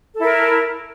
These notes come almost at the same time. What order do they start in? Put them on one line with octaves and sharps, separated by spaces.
A4 E4 A#4